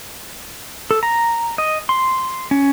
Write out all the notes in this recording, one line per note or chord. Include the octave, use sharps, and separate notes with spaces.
A4
A#5
D#5
C6
C#4